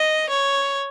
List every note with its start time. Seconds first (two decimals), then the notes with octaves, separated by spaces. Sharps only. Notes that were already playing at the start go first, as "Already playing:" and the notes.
Already playing: D#5
0.29 C#5